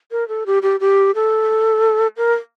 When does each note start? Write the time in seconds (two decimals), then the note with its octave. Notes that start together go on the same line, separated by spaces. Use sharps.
0.12 A#4
0.28 A4
0.46 G4
0.63 G4
0.80 G4
1.15 A4
2.17 A#4